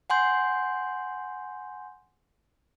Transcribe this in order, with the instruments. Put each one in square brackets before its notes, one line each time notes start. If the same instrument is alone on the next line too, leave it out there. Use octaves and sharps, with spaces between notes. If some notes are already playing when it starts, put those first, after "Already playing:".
[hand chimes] F#5 G#5 C6 G6